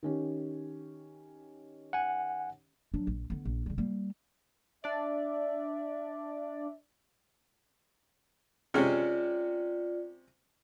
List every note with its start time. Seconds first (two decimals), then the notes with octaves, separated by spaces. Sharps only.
0.03 D#3 C#4 G4
1.93 F#5 G#5
2.94 F#3 D4
3.07 A#1
3.30 D3 B3
3.45 A#1
3.66 C#3 G3
3.78 G3 A#3
4.84 D4 D5 E5
8.74 C3 G#3 C#4 F4 D5